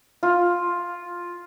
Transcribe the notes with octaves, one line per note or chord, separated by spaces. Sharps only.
F4